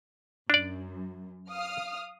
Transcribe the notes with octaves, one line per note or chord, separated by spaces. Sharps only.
F#2 D4 D5
F5 D#6 F6